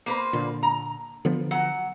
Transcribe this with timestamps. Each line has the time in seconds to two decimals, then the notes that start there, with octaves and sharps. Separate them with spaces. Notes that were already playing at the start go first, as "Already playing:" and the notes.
0.06 A#3 B4 C5
0.33 A#2 D3
0.63 A#5
1.25 D3 F3 B3
1.51 F#3 F#5